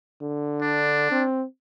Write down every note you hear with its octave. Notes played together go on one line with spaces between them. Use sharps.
D3
D4
C4